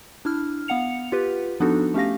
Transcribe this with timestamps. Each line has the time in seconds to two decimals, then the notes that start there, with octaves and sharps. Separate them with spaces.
0.25 D4 E4 F6
0.68 B3 F5 F#5 C#7 F7
1.12 F4 G4 B4
1.60 F3 B3 D4 D#4 F#4 A4
1.94 A3 C#4 G4 F5 A#6